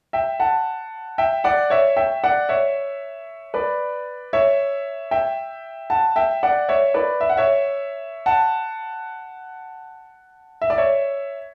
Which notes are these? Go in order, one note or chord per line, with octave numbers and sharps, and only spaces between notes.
E5 G5
F#5 A5
E5 G5
D5 F#5
C#5 E5
E5 G5
D5 F#5
C#5 E5
B4 D5
C#5 E5
E5 G5
F#5 A5
E5 G5
D5 F#5
C#5 E5
B4 D5
E5
F#5
C#5 E5
F#5 A5
E5
D5
C#5 E5